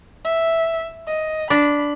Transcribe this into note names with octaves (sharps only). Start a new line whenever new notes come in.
E5
D#5
D4 B5